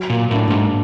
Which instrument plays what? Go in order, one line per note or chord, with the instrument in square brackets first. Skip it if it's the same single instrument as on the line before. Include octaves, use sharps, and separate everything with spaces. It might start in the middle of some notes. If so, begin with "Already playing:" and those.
Already playing: [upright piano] F#3
[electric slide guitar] A#2
[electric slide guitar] A2 [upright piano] A#3 D4
[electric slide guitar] G#2